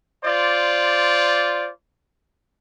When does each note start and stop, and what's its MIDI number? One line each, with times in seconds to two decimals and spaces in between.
0.25 1.70 65
0.25 1.70 72
0.25 1.70 74